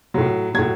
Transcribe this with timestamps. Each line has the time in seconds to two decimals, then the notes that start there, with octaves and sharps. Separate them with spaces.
0.14 A2 F#3
0.54 F#3 G#6
0.58 A2